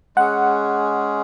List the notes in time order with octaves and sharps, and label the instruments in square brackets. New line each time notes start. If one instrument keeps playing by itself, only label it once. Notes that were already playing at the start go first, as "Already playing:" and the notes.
[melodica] G#3 C#4 G#4 [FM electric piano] F#5